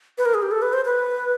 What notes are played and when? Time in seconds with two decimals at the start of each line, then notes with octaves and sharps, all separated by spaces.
0.18 B4
0.26 A#4
0.34 G#4
0.42 G4
0.51 A4
0.62 B4
0.73 C5
0.85 B4